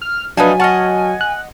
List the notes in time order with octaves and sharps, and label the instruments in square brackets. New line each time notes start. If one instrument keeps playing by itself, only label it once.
[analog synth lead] F6
[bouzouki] F3 A3 D#4 [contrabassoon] F#3 [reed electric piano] D4 B4 [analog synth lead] G#5
[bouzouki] D#5 F#5 [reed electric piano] A5 C#6 F6
[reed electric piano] F#6